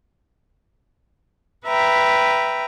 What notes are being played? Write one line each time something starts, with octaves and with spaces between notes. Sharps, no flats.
B4 E5 G5 A#5